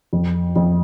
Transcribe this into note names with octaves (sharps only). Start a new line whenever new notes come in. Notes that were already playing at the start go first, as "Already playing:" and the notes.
F2
F2